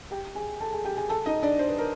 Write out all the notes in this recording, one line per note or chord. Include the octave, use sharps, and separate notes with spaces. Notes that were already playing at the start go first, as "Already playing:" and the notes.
G4 G5
G#4 G#5
A4 A5
G#4 G#5
G4 G5
G#4 G#5
A4 A5
D#4 D#5
D4 D5
C5
B4
A#4